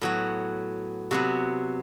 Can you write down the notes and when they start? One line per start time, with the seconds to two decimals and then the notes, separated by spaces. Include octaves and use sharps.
0.01 A2 F#3 B3 F#4
1.11 C3 F#3 B3 F#4